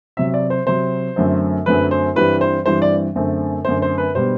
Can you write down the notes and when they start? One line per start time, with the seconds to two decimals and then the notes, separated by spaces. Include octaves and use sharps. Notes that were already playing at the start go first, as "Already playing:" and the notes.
0.17 C3 F#3 C4 E5
0.34 D5
0.50 C5
0.66 C3 F#3 C4 C5
1.16 F#2 D3 F#3 A3 C4
1.66 F#2 D3 F#3 A3 C4 B4
1.91 C5
2.16 G2 E3 G3 C4 B4
2.41 C5
2.66 G2 E3 G3 C4 C5
2.82 D5
3.15 F#2 D3 A3 C4
3.65 F#2 D3 A3 C4 C5
3.82 C5
3.98 B4
4.15 B2 G3 B3 D4 C5